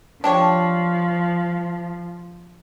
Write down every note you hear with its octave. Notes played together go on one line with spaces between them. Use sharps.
F3 D4 G4 C#5